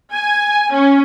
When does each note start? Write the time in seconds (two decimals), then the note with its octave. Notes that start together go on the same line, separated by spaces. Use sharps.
0.12 G#5
0.71 C#4